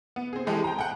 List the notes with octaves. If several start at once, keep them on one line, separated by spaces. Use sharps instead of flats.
B3
C4 G#4
E3 G#3 G4 A4
G5 A#5
F#5 G5